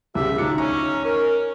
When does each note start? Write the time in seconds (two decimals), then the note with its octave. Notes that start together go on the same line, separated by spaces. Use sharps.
0.15 C2 C#3 G4 E5
0.38 D2 D4 D#4 F4 C#7
0.58 C#4 A#5
1.05 C#4 A#4